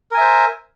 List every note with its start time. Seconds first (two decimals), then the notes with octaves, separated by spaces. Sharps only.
0.11 A#4
0.14 G#5
0.17 E5
0.21 C5